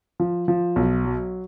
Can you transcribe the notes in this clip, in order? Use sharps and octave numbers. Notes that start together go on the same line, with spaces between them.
F3
F3
B1
F#3